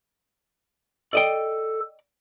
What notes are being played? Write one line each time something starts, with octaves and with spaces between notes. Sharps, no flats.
A4 D5 D#5 G5